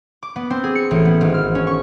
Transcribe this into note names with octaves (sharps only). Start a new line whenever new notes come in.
D6
B3
C4
G#4
C#7
A1
B3
G#1
F6
C#4
C#6